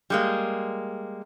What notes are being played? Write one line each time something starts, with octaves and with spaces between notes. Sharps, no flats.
G3 G#3 A#3